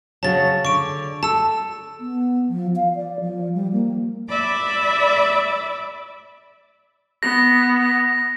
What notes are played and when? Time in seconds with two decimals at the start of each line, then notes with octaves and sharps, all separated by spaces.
0.23 C#3 F#3 A5 A6
0.65 D3 C#6 D7
1.23 A4 A5 E6
2.00 B3
2.49 F3
2.76 F5
2.95 D5
3.20 F3
3.55 G3
3.72 A#3
4.29 D5 E5 B5 D6
7.23 B3 A#6